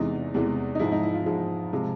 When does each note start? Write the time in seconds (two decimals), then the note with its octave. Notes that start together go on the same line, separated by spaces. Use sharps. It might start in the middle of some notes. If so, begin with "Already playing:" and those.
Already playing: E2 C3 E3 G#3 D#4
0.34 E2 C3 E3 G#3
0.75 D#4
0.79 G#2 F3 G#3 E4
0.92 D#4
1.03 E4
1.14 F4
1.26 G#2 F3 G#3
1.73 C3 F3 G#3